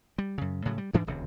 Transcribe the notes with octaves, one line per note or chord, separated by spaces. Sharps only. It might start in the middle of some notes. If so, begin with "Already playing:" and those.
G3
F#2 C#3
A2 C#3 F#3
G3
D2 G#2 E3 D4
D#1 C#2 C3